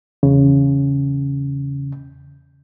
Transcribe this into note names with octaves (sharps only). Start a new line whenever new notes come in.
E2 C#3